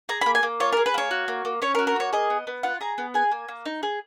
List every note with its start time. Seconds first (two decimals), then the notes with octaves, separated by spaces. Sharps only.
0.09 G#4 A#5
0.21 B5
0.26 A#3
0.35 G#5
0.43 A#3
0.60 F4 C#5
0.73 A#4
0.77 G#4
0.86 B4
0.94 A#3 C#5
1.11 F#4
1.28 A#3
1.45 A#3
1.62 C#4 C#5
1.75 A#4
1.79 F#4
1.87 A#4
1.96 A#3 C#5
2.13 G#4 D#5
2.30 B3
2.47 B3
2.63 F4 F#5
2.81 G#4 A#5
2.98 B3
3.14 G#4 G#5
3.31 A#3
3.48 A#3
3.66 D#4
3.83 G#4